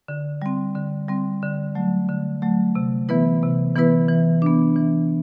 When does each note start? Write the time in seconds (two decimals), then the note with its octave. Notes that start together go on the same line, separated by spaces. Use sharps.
0.08 D3
0.42 G3 C4
0.75 D3
1.08 G3 C4
1.42 D3
1.75 F#3 A3
2.09 D3
2.42 F#3 A3
2.75 C3
3.09 E3 B3 E4 B4
3.43 C3
3.75 E3 B3 E4 B4
4.09 E3
4.42 B3 D4
4.76 E3